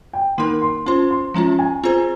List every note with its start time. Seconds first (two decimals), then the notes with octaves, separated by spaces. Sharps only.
0.13 G5
0.38 D#3 A#3 D#4 A#4 C6
0.62 C6
0.86 C#4 F4 C5 C6
1.10 C6
1.34 F3 G#3 C#4 F4 A#5
1.59 G#5
1.84 C4 F4 G#4 C5 A#5